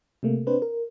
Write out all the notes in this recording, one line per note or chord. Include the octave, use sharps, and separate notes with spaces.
C3 A3 A#3
C4 D4 B4 C5
A#4